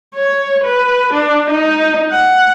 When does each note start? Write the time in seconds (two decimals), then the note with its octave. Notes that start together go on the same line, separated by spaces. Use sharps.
0.15 C#5
0.64 B4
1.14 D4
1.50 D#4
2.11 F#5